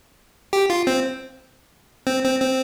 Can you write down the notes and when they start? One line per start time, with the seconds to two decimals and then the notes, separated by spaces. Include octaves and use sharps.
0.53 G4
0.70 F4
0.87 C4
2.07 C4
2.24 C4
2.41 C4